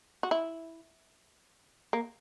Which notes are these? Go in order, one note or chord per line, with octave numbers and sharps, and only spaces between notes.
F#4
E4
A#3